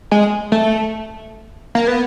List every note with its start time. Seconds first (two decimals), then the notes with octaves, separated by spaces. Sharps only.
0.11 G#3
0.52 A3
1.75 A#3
1.88 B3